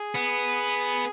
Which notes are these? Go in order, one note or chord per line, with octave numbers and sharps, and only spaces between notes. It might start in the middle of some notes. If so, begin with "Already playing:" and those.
Already playing: G#4
B3